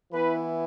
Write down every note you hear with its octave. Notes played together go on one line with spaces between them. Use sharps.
E3 B3 E4 B4